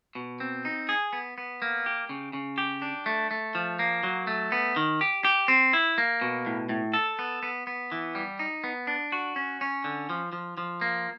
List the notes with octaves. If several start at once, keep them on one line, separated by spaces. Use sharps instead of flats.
B2
C4
D#4
G#4
B3
B3
A#3
G4
C#3
C#3
G4
D4
A3
A3
F3
A#3
F#3
A3
B3
D#3
G4
G4
C4
E4
A#3
B2
A2
A2
A4
B3
B3
B3
E3
G3
D#4
B3
D4
F#4
C#4
C#4
D3
F3
F3
F3
A#3